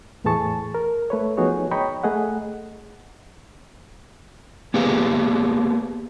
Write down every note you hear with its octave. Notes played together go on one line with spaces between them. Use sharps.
E2 A2 E3 G#4 A5 C#6
A#4
A3 B4 C#5
F3 B3 D#4 F#4 G#4 C#5
C#5 D#5 G5 A#5 B5 C#6
A3 G#4 D#5 F#5
A#3 B3 G4 G#4 B4 F5